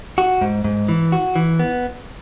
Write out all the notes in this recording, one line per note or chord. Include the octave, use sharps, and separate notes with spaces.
F#4
G#2
G#2
E3
F#4
E3
B3